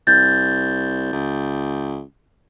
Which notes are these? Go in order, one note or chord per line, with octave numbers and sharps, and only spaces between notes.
C2 G6 A6
C#2